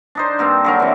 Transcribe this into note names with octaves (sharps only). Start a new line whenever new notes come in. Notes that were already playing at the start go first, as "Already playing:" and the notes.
D4 D#4 C5
G2 A#3 C4
D3 F#3 A#4
C3 E3